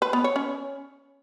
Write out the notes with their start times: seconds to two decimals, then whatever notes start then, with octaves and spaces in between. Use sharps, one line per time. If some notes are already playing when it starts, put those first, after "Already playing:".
0.02 B4
0.13 B3
0.24 C#5
0.36 C#4